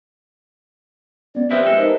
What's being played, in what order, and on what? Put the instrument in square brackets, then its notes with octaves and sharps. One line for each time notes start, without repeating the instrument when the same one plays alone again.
[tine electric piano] B3 C#4 [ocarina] D5
[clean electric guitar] F3 C4 E4 [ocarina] G4 [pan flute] B4 [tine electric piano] E5
[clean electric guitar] G#3 A4
[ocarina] D#4 [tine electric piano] A#4 C5 D#5